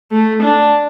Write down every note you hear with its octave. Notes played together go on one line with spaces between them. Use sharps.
A3
D4